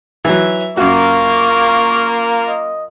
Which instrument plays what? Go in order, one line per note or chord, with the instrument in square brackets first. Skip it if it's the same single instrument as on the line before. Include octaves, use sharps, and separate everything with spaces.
[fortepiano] E3 F#3 [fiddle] E5
[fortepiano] F#2 F#4 [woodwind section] A#3 [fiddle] F4 A#4 [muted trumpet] C#6
[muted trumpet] D#5